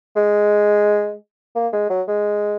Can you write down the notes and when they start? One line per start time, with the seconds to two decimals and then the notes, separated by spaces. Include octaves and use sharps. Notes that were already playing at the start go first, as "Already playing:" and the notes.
0.16 G#3
1.55 A#3
1.73 G#3
1.90 F#3
2.07 G#3